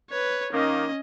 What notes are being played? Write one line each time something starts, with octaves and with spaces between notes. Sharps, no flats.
B4 C#5
D#3 A#3 C#4 D#5